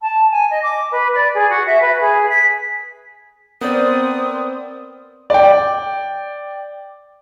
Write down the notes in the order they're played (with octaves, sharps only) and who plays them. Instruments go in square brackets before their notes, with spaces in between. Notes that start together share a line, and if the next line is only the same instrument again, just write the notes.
[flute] A5
G#5
D#5
D6
B4
D5
G#4
F#4
E5
B4
G#4
B6
[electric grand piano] B3 [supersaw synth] C4 [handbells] A#4 C5 D5 [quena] D#6
[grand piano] D5 G5